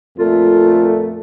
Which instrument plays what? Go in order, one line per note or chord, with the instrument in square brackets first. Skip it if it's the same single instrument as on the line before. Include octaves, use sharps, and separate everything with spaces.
[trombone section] F2 A#2 A3 [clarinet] F4